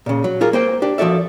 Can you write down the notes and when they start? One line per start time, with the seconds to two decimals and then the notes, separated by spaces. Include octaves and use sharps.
0.06 A#2 C#3
0.24 F#3
0.41 F4 G#4 A#4
0.53 A#3 C5 G5
0.82 D4 G4
0.98 F3 F#4 A4 D5 E5